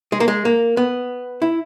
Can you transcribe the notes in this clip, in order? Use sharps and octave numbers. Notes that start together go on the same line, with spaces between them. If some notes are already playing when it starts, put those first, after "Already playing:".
G#3
A#3
G#3
A#3
B3
E4